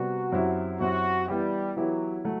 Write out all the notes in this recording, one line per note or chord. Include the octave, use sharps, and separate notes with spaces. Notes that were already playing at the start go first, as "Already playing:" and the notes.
Already playing: C3 G3 B3 F#4
F#2 F#3 C4 E4 G4
F#2 F#3 C4 E4 F#4 G4
E3 G3 B3 E4 G4
E3 F#3 B3 E4 G4
F#3 A3